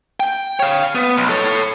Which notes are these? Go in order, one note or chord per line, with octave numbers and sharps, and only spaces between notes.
G5
C#5 F5
B3
B1
A4 C#5